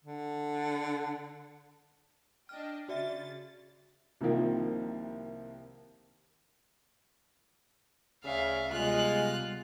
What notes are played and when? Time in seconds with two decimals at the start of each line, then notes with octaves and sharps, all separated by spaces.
0.05 D3
2.49 D4 D#5 G5 F6
2.89 C#3 F#4 D5 E5 A6
4.21 C2 C3 D#3 F3 A#3
8.24 D2 C#3 D5 E5 F5
8.72 C3 G3 G#3 B3 F4 F#6